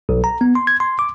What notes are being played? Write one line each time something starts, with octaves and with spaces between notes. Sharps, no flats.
B1
A#5
B3
C6
G#6
C6
D6